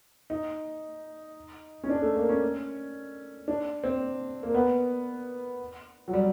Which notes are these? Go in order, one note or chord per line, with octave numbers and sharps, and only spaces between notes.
D#4
C#4
D4
A3
A#3
C#4
D4
C4
A#3
B3
F#3
G3